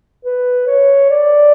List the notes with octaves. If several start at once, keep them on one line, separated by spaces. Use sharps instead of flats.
B4
C#5
D5